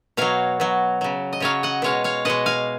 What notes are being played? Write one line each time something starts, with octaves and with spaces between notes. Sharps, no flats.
B2 F#3 C#5 F5
B2 F#3
C#3 F#3
D#5
C#3 F#3 C#5 F5
D#5 F#5
B2 G#3 C#5 F5
C#5 F5
B2 G#3 D#5 F#5
F5 G#5